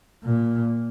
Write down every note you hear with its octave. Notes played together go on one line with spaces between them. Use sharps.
A#2